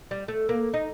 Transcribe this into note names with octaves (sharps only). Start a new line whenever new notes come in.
G3
A3
A#3
D#4